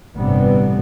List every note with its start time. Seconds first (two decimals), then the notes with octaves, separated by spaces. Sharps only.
0.16 G1 A2 C3 E3 G3 B3